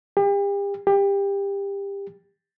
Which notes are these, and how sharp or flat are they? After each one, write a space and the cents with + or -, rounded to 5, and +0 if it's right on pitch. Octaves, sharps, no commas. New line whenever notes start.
G4 +40
G4 +25